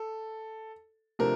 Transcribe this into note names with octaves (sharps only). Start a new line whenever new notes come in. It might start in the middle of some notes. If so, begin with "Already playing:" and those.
Already playing: A4
C3 F3 A3 D4 A#4